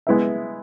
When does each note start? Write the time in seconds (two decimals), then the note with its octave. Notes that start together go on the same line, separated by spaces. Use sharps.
0.07 G#3 B3 E4 B4 E5